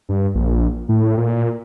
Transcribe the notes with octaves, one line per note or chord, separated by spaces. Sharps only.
G2
A#1
A2
A#2